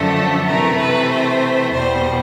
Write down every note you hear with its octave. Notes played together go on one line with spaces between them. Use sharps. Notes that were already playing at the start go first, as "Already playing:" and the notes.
Already playing: F#2 D3 F3 A3 A4
C3 E3 A3 A#4
B4
C5
E2 B2 G3 C5